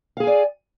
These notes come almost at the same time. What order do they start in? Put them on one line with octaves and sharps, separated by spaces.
F5 G#4 G#5 D5